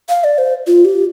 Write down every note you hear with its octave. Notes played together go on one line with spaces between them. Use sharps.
F5
D5
C5
F4
G4